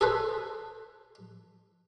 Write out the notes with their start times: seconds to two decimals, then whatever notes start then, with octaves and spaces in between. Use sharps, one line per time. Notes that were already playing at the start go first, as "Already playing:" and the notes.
0.01 G#4 A4 B4 C5